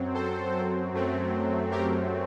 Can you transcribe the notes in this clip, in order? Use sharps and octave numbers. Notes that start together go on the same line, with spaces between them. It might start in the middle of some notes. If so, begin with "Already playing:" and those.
Already playing: F#2 F#3 C4
A4 C5
F#2 F#3 A3 C4
G4 A#4